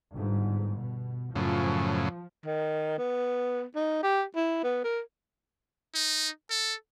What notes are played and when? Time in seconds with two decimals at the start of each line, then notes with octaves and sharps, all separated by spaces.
0.14 G1 G#2
0.79 B2
1.36 F#2 A2 C#3 F3
2.46 D#3
2.98 B3
3.76 D#4
4.03 G4
4.36 E4
4.64 B3
4.84 A#4
5.95 D#4
6.50 A4